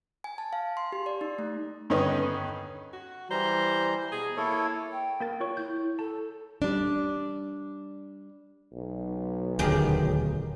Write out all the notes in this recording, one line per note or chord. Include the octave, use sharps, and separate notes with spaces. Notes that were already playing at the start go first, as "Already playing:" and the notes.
G#5
A5
F5
C6
G4
D5
D#4
A3
G2 D3 D#3 B3 C#4 D#4
F#4
E3 G3 C5 A#5
B2 G#4
A#3 E4 A4 C#5
G5
A#3 A#4 A6
F4 C#5 C#6
E4 G6
A4 A5
G3 D4
B1
D#1 D2 D#3 G4 G#4